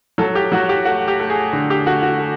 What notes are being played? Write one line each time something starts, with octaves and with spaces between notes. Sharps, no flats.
F#3 A4
G4
F#3 F#4
G4
A3 F#4
G4
A3
G#4
D3
G4
A3 F#4
F#4
A3